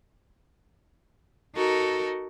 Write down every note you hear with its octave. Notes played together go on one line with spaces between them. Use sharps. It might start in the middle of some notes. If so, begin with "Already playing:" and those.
D#4 F#4 A4 A#4